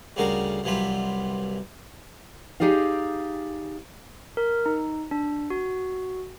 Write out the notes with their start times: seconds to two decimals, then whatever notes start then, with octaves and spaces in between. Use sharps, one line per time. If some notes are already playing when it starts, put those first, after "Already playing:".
0.16 D2 C#3 G3 F#4 A#4 F5
0.64 C2 E3 F#3 G3 F4 B5
2.60 D#4 G4 G#4 D5 F5
4.37 A#4
4.66 D#4
5.11 D4
5.50 F#4